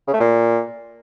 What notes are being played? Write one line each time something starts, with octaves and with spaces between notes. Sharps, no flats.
C#3
A3
A#2